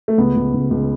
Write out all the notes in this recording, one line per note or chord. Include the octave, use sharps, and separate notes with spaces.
A3
C#2 B3
C#2
C#2
C#2